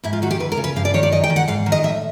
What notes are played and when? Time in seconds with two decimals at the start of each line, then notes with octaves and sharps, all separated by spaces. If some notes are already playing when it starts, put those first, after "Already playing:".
0.04 G#2 E4
0.13 F4
0.22 D#3 F#4
0.31 G4
0.40 D2 B4
0.52 A#4
0.57 C#3
0.64 B4
0.76 G2 F5
0.85 D5
0.94 D#3 C#5
1.03 D5
1.12 F#2 D#5
1.24 G5
1.30 D#3
1.36 F#5
1.48 G#2 F5
1.66 D#3
1.72 D#5
1.83 A2 E5